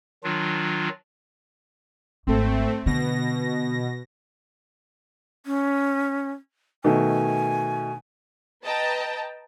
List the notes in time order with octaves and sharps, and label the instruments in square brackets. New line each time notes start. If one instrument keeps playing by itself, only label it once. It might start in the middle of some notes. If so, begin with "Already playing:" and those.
[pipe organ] D#3 F#3 D4 F4
[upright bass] G#1 [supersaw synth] A3 C4
[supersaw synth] B2 A#6 [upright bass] D3
[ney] C#4
[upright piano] B2 D#3 A3 [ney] G#5
[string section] B4 D#5 G5 A5 A#5